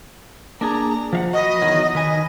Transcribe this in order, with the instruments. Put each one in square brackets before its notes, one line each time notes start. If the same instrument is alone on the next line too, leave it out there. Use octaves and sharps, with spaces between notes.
[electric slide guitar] A#3 D4 G#4 [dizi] A#5
[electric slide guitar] F3 F5 F#5
[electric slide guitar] F#4 B4 [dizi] D#5
[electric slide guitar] E2 D#3 F#3
[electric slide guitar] D#3 B4 G#5 [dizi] D#5